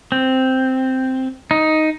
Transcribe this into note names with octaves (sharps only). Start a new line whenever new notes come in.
C4
D#4